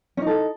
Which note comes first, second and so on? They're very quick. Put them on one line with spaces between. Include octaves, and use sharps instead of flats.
C#4 D#4 A4